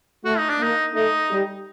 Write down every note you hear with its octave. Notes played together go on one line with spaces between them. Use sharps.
A3 F#4
D#4
D4
A#3 D#4
A3 D#4
G3